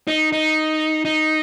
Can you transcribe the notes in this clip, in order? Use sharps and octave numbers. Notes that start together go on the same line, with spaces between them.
D#4
D#4
D#4